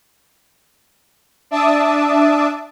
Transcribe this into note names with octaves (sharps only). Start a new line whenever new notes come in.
D4 E5 A5 D6 D#6